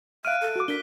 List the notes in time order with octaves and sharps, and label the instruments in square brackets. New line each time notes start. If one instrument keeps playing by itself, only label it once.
[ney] E5 [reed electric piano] F5 F6 [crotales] F#6 D7 D#7
[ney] A4
[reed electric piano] F#4 D6
[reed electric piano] D4 [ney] A#4 [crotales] B6 G7